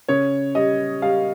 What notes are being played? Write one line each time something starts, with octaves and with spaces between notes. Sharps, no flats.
C#3 C#5
G3 D#5
G3 F5